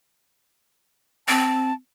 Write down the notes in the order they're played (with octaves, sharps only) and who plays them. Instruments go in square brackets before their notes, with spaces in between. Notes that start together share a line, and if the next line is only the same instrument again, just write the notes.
[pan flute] C4 [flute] A5